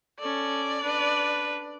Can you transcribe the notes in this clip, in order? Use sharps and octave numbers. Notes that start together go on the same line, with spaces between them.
C#4 A4 D5
D4 B4